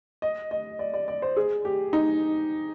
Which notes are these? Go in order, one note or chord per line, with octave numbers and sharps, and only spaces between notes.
D#5
D#5
D5
D5
D5
C5
G#4
G4
D#4